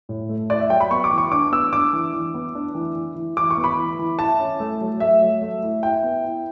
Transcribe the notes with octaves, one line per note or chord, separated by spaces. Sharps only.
A2
A3
E4 D5
E5
F#3 G5
B5
B3 C#6
D6
E3
C#6
D4 D6
B3 E6
D4 D6
E3
E3
B3
D4
E3
E3
E3
E3 D6
C#6
B3
B5
E3
E3
E4 A5
C#4
A3
F#3
A3 E5
F#3
A3
E4
E4 G5
B3
E4